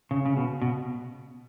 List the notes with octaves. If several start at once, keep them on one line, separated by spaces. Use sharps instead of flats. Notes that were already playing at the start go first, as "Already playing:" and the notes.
C#3
C#3
B2
B2